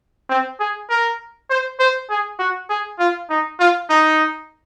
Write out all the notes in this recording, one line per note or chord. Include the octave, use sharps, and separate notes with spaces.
C4
G#4
A#4
C5
C5
G#4
F#4
G#4
F4
D#4
F4
D#4